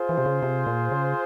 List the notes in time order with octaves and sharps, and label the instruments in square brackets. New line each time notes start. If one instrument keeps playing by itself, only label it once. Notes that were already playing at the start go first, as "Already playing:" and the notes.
Already playing: [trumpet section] F4 G#4 C5
[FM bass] E3
C3
C#3
C3
A#2
C#3